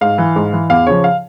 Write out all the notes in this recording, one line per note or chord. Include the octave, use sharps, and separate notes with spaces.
G#2 F5
E3
G#2
E3
E2 F5
C#3 F3 C#5
F5